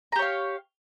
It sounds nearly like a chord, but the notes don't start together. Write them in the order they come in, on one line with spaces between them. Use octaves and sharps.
A#5 G4 C#5 F5